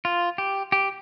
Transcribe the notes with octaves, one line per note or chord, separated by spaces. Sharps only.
F4
G4
G4